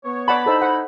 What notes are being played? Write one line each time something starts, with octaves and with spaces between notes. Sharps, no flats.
B3 C#5
D5 F#5 A5 B5
D#4 E4 A4 C5
C5 F#5